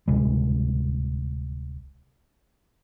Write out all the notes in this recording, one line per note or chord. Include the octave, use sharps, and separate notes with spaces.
D1 C2 G#3